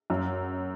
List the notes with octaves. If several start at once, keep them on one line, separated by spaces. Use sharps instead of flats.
F#2